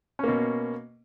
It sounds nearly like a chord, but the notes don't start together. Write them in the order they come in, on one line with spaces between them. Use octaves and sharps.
C#4 A#3 B2